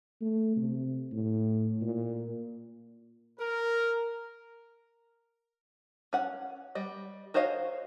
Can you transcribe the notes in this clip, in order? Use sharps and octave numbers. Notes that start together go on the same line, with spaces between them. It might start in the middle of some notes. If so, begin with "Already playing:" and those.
A3
C3
A2
A#2
A#4
C#4 F#5
G3 D#5
F#4 C5 C#5 D#5 F5